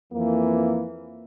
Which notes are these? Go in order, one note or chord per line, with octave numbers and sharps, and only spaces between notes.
F2 E3 A#3